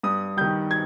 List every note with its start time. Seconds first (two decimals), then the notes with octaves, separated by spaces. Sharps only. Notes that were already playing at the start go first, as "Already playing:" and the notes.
0.03 G2 D#6
0.37 D#3 G3 G6
0.71 G#6